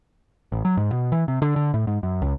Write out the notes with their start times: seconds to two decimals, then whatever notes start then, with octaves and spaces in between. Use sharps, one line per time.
0.52 A1
0.65 F#3
0.77 G#2
0.92 B2
1.12 E3
1.28 C3
1.42 D3
1.56 D3
1.74 A2
1.87 G#2
2.03 F#2
2.22 C#2